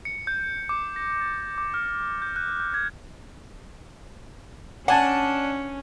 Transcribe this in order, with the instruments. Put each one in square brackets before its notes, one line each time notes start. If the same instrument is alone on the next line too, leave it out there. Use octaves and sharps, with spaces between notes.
[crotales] C#7
G6
D6
A#6
A6
D6
F6
G6
F#6
G6
G#6
[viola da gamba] C#4 [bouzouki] D4 [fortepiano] F#5 G#5 A5